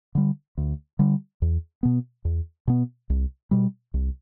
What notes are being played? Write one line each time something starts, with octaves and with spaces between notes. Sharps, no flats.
D3 G3
D2
D3 G3
E2
B2 B3
E2
B2 B3
C2
B2 G3
C2